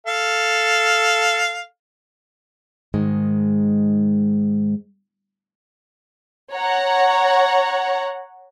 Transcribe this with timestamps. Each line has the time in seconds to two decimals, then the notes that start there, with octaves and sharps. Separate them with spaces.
0.07 A4 F5
2.94 G#2 D#3 G#3
6.52 C#5 F#5 A#5